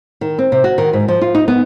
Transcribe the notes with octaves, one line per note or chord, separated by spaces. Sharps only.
D#3
C4
C3
F#4
D#3
G#2
F3
F4
D#4
B3